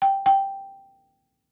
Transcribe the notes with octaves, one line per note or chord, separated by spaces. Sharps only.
G5
G5